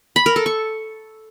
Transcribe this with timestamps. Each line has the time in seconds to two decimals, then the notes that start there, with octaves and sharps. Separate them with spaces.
0.16 B5
0.26 A#4
0.36 A4
0.46 C#6